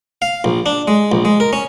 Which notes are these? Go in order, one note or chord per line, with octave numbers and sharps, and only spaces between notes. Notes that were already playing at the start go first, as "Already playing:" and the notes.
F5
A#1
D4
G#3
A#1
G#3
A#4
C#4